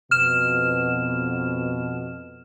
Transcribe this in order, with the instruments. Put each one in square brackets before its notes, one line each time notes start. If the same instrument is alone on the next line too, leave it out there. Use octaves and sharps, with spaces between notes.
[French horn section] F2 B2 [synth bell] F6 E7